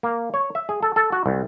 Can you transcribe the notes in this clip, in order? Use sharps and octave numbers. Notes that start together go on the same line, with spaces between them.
A#3
C#5
E5
G#4
A4
A4
F#4
C2